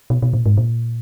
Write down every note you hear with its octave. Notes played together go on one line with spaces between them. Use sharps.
B2
B2
A#2
G#2
A#2